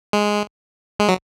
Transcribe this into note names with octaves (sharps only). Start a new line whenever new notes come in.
G#3
G#3
F#3